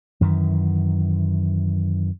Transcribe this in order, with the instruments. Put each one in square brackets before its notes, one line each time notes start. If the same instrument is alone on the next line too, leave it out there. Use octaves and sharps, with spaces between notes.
[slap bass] F#2 D#3 E3